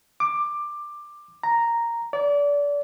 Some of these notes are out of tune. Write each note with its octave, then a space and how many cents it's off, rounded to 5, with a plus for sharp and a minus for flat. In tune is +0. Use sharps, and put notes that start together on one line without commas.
D6 +15
A#5 -5
D5 -30